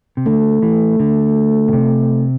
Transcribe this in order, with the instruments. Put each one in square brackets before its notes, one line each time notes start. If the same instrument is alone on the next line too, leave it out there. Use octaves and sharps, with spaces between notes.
[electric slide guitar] C3
[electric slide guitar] D3 [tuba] A3
[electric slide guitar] E3
D3
B2
C3